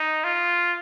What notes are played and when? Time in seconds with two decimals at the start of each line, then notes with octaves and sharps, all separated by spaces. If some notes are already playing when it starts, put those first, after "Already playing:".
Already playing: D#4
0.24 F4